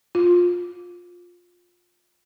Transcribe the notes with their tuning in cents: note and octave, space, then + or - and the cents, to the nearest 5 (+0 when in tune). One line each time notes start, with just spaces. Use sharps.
F4 +20